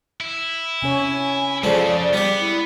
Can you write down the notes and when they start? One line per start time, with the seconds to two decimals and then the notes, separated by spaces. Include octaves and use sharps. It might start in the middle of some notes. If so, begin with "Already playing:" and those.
0.21 E4
0.82 C3 C#4 C#5 G#5
1.63 F2 C#3 F3 G#3 D5
2.13 G3 B3 G4
2.40 E4